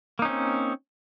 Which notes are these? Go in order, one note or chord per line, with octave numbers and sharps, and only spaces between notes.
A#3 C4 C#4 D#4